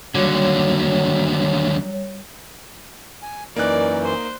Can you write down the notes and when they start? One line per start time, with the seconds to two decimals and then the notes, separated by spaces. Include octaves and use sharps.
0.15 D#2 D3 F#3 G3 C#5
3.22 G#5
3.56 F#2 E3 A#3 D#4 D5 F#6
4.04 C5